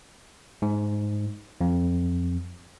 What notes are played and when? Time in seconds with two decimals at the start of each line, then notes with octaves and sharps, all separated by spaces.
0.62 G#2
1.61 F2